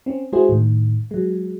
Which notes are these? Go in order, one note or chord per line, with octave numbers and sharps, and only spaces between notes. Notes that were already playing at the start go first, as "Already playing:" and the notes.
C4 C#4
G#3 E4 F#4 G#4 C5
A2 D#3
F#3 G#3